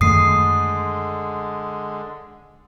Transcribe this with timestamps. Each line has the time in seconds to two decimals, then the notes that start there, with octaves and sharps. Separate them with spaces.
0.01 F#2 D3 D#3 G#3 A3 D#6 C7